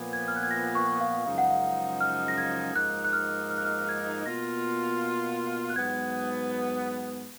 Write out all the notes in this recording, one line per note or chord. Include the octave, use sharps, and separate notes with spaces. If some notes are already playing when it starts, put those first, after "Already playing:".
Already playing: A#2 F3 B3 G#6
G#6
F6
F#6
G#6
A#6
C#6
F5
F#2 C#3 F3 G#3 D#4 F5
F#5
F5
F6
A#6
G#6
G#2 F3 A#3 D#4 F#6
F#6
F6
F6
F#6
F6
F#6
F6
G#6
B2 A#3 F4 A#6
F#6
G#2 F#3 B3 G#6